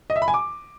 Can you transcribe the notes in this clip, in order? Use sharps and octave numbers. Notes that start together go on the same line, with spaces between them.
D#5
E5
B5
G#5
D6